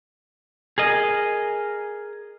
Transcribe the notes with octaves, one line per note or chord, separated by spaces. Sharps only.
G#4 A#4 D#5